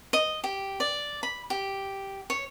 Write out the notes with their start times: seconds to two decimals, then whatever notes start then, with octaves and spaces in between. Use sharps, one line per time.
0.13 D#5
0.44 G4
0.80 D5
1.23 B5
1.50 G4
2.30 C#5